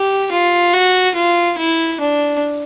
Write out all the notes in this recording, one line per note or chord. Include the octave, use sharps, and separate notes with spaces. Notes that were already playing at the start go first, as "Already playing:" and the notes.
Already playing: G4
F4
F#4
F4
E4
D4